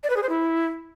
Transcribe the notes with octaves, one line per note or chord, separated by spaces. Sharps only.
D5
B4
G#4
C5
E4